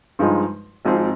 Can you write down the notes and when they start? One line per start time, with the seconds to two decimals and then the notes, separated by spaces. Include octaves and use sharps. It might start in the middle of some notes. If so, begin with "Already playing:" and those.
0.19 G2 F3 G#3 D#4
0.85 G#1 G#2 F3 C4